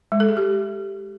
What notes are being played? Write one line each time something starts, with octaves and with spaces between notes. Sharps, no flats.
G#3
A4
G#4
G4